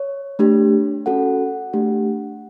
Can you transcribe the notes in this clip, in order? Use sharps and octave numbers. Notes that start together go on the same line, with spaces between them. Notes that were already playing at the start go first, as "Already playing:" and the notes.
Already playing: C#5
A3 D4 G4
C#4 F#4 A4 F#5
A3 D4 G4